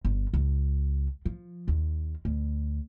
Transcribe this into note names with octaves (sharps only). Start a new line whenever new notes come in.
G1
C#2
F3
D#2
D2